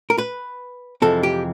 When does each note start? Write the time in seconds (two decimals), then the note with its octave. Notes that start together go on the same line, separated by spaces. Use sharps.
0.10 A#4
0.18 B4
1.02 F2 C3 E3 G#3 C4 A4
1.23 G4